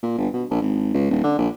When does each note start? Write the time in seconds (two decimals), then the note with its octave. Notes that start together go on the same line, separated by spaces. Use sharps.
0.03 A#2
0.18 G1
0.33 B2
0.51 A#1
0.62 G#1
0.94 C#2
1.11 D#1
1.24 D3
1.39 A#1